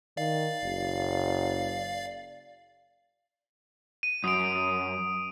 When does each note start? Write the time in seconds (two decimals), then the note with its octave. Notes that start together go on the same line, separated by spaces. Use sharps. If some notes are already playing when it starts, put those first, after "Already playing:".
0.17 D#3 D5 F5
0.63 F#1
4.03 D#7
4.24 F#2 D#6 D7